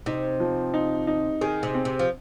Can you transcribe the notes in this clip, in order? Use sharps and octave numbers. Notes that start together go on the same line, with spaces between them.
C3 D#4
F3
D#4
D#4
D#3 G#4
C3
C4
C3
F3